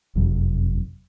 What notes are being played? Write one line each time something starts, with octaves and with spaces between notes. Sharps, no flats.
F#1 F2 C3 F#3